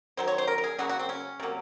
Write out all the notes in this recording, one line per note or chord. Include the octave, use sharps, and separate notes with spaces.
D#3 F#3 C5
C#5
C5
A#4
A#4
G#4
C#3 F#3 A#3 F#4
F#4
C4
C#4
C3 F#3 A#3